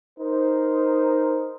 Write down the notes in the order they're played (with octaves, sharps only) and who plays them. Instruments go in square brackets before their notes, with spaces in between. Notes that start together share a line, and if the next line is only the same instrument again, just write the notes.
[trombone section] D#4 A#4 C5